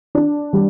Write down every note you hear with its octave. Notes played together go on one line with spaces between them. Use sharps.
D4
G3